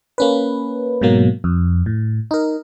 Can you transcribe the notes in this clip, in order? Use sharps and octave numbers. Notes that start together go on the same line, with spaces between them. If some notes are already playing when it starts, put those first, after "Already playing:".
A#3 C#4 B4
G#2 B2 F#3 A#3
F2
A2
D#4 A#4